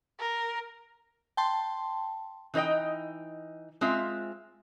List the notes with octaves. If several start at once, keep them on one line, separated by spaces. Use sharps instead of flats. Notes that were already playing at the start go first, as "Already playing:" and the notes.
A#4
G5 A5 C6
E3 D#4 C5 D#5 G5
G#3 C4 F4 E5